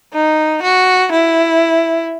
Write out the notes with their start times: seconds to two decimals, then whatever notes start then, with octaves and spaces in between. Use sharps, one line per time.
0.13 D#4
0.63 F#4
1.12 E4